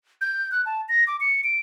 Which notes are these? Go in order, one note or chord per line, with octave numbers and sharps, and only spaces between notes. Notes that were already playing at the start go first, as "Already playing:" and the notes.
G6
F#6
A5
A#6
D6
C#7
D7